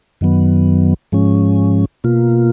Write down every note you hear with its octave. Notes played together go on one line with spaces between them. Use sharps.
F#2 D#3 F#3 B3
G#2 F3 G#3 C#4
B2 A#3 F4